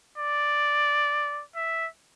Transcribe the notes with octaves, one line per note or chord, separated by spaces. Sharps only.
D5
E5